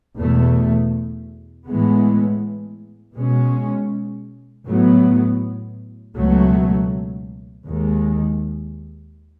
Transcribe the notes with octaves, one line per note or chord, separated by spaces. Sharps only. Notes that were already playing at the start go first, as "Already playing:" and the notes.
E2 B2 A3
A2 E3 G#3 B3
B2 G#3 C#4
A2 F#3 B3
C#2 B2 F#3 A3
D#2 D#3 G#3